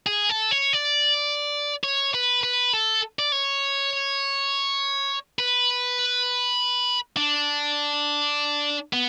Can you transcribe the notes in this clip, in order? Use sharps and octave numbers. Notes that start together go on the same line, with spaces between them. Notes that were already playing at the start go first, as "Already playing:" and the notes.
G#4
A4
C#5
D5
C#5
B4
B4
A4
D5
C#5
B4
D4
B3